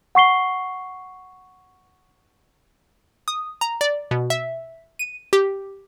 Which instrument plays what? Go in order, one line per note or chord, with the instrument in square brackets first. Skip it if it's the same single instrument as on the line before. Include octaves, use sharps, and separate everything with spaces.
[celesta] F#5 C#6 C7 G7
[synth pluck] D#6
A#5
D5
B2
E5
D#7
G4